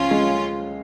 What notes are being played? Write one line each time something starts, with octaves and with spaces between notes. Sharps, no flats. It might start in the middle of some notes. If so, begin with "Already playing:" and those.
Already playing: C#2 F3 C#4 F4
G#3